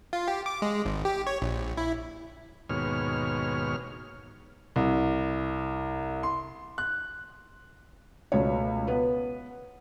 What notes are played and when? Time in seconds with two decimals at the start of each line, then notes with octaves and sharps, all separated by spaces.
0.13 F4
0.28 G4
0.46 D6
0.62 G#3
0.85 G#1
1.05 G4
1.27 C#5
1.42 A#1
1.77 E4
2.70 D#2 G#2 B2 C#5 F6
4.76 C2
6.23 C6
6.78 F#6
8.32 C#2 B2 A3 C#5
8.88 B3 B4